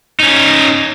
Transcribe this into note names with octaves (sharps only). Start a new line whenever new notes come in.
C#4 D#4